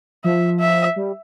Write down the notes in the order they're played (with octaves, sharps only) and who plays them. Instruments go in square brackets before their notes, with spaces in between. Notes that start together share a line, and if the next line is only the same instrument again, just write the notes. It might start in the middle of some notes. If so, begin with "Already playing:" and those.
[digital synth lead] F3 [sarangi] E5
[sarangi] E5
[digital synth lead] G3